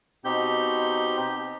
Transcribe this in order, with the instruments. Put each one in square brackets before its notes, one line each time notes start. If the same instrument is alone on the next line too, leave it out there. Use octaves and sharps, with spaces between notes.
[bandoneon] B2 C4 D#4 G4 G6